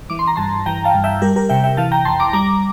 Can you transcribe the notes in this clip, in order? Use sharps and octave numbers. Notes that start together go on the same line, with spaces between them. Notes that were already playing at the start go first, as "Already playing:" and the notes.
E3 D6
C6
A#5
G2 A5 C6
E3 G5 A#5
F5 A5
G2
E5 G5
G3 G4 A#4
G4 A#4
C3 E5 G5
E5 G5
E3 F5 A5
G5 A#5
F2 A5 C6
A#5 D6
G3 A#5 D6